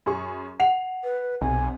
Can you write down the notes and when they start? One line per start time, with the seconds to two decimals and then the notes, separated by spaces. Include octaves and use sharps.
0.06 F#2 G#4 C#6
0.60 F#5 C7 F7
1.04 B4
1.41 B1 C3 G#5